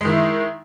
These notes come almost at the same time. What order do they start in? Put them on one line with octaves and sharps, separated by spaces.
G#3 D#3 E4